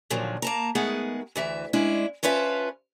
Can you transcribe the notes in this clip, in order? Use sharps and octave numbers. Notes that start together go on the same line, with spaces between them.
A#2 D3 D#3 F3 F#3
A#3 A5 A#5
D#3 G#3 A3 B3 G#4 F#5
D2 E3 E5
G#3 C#4 D4 E4
F3 C#4 F4 B4 E5